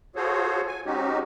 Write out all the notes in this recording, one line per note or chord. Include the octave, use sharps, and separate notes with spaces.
F4 F#4 G#4 A4 C5 C#5
G#5
G#3 C4 C#4 D#4 F#4 G4